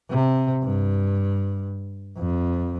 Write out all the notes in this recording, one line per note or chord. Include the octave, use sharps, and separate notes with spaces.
C3
G2
F2